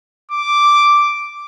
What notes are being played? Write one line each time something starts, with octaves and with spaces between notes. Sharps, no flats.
D6